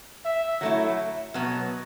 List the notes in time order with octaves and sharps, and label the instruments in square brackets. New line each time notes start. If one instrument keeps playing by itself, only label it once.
[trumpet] E5
[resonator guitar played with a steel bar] F#3 A3 E4
B2 F#3 B3